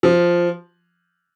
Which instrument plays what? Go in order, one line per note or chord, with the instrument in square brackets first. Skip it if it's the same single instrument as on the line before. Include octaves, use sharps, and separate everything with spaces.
[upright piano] F3